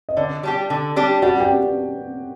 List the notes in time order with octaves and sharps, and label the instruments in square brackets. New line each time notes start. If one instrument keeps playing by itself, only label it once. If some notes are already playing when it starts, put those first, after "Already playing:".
[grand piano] D#5
[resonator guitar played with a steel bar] D3 [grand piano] D5
[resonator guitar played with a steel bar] G3 D4 G4
D3
G3 D4 G4
[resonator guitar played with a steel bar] G3 [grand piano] F#4 F#5
[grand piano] G4 G5